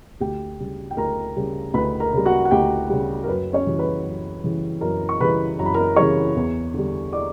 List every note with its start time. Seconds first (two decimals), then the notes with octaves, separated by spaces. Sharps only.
0.20 D2 G4 G5
0.60 C#3 G3
0.91 G5
0.97 D2 A#4 A#5
1.36 C#3 G3
1.74 D2 B4 B5
2.00 A#4 A#5
2.13 C#3 G3
2.25 F#4 F#5
2.45 F#5
2.51 D2 G4 G5
2.90 C#3 G3
3.24 A#4
3.28 F#2 B4
3.53 C#4 C#5
3.67 C#3 E3 G3
3.79 B4 B5
4.06 F#2
4.44 C#3 E3 G3
4.81 F#2 A#4 A#5
5.09 C#6
5.20 C#3 E3 G3 B4 B5
5.59 F#2 A#5
5.66 B5
5.74 A#4 A#5
5.96 C#3 E3 G3 C#5 C#6
6.36 E2
6.74 D3 G3
7.13 D5 D6